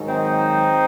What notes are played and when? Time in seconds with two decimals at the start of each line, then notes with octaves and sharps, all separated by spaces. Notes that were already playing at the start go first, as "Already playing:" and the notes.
Already playing: G#2 D#3 F#3
0.08 C4 D#4